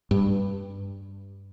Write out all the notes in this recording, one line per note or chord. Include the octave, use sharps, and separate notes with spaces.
G2